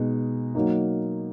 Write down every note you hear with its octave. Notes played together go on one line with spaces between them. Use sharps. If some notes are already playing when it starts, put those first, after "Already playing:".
Already playing: B2 G#3 D#4
F#3 A#3 D#4